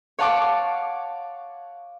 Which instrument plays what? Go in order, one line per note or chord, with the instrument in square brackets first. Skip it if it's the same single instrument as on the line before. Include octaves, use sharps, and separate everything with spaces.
[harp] C#5 F5 F#5 A5 C#6 D6